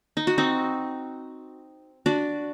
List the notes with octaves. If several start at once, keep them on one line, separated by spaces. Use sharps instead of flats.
D#4
F#4
C4 D#4
D4 F#4